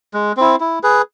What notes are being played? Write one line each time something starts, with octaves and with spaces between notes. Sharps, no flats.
G#3
C4 E4
E4
G#4 B4